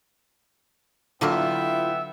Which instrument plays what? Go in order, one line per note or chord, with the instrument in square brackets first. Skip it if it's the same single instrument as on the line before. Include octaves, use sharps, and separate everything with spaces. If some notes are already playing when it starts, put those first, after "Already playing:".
[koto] D3 F#3 A#3 [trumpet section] B3 E5 G5 [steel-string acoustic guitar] E4 F4